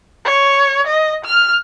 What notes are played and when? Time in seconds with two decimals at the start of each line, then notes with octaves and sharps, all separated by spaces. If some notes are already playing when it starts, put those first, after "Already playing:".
0.25 C#5
0.87 D#5
1.25 F6